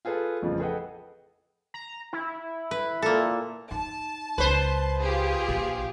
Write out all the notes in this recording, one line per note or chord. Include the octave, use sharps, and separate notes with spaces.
F4 G#4 A4 B4
A1 F2 C#3 F3
G#4 A4 B4 D#5 F#5 G5
A#5
E4
B4
A#2 A#3 A4
D#4 A5
C#2 B4 C5
F4 G4 G#4
A#1